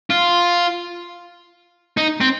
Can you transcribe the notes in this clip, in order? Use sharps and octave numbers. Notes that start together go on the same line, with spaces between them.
F4
D#4
C4